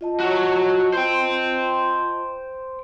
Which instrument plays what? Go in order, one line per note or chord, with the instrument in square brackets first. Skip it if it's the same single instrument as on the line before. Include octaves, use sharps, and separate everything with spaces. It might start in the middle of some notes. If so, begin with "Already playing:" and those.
[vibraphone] F4 D#5 A5
[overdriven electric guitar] F#4 C#5
C5 G5